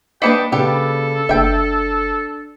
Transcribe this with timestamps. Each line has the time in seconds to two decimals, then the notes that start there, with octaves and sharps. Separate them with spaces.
0.22 A#3 D4 B4 D#5 G5 B6 C#7 E7
0.52 C#3 D4 G4 A4 B4
1.29 F#1 D4 E5 G5